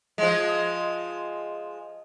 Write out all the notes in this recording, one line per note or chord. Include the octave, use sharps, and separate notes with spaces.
F3 G#3